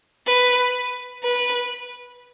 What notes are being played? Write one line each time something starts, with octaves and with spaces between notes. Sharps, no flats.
B4
B4